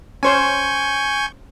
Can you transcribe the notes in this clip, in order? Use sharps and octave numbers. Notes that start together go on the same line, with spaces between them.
C#4 C5 C#5 G#5 C#6 G6